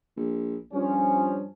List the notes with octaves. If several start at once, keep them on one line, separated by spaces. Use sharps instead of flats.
A#1
G2 F3 C#4